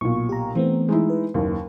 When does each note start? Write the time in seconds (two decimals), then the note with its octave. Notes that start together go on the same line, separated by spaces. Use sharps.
0.01 B1 A#2 C#6
0.29 G4 A#5
0.55 E3 A3 B3 C4
0.89 G#3 D#4 E4
1.10 B4
1.34 F#1 D#2